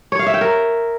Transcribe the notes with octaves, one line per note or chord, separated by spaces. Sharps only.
C#5
F5
E5
G5
A#4